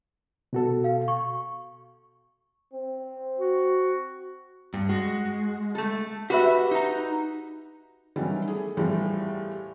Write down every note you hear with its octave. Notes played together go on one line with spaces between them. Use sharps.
B2 F#4 A4
F5
C#6
C4
F#4
G2
G#3 F#4
A3 A4
F#4 G4 B4 E5
D#4 A#5
D#3 E3 F#3 G3 C#4 G4
A3 G#4
E2 A2 E3 F3 G3